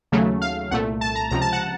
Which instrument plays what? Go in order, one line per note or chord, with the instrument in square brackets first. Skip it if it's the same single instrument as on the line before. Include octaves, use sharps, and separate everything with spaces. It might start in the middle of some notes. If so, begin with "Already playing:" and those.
[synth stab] D#2 C#3 F#3 A3
F5
C2 A#2 A3 F#5
A5
A#5
C#2 C3 F3 A#5
A5
F#5